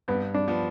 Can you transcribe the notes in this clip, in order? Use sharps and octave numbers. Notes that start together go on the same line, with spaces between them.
G2 B3
D4
F3 B3